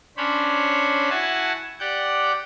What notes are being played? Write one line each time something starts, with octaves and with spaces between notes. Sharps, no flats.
C#4 D4 C5 C#5 B5
E4 F#4 F#5 G#5 A5
G4 D5 F#5 G6